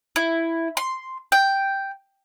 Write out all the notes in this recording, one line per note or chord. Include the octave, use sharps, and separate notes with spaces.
E4
C6
G5